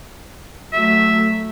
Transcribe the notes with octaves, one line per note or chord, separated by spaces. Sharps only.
F#3 A3 E5